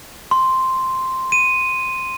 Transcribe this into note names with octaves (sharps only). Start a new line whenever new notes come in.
C6
D#7